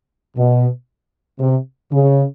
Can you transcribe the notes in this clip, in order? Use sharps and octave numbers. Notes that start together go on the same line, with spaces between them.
B2
C3
C#3